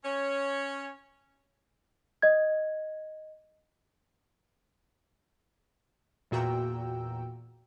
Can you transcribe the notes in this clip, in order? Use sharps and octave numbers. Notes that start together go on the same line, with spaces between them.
C#4 C#5
D#5 G#6
E2 A#2 F#4 G5 A#5 E6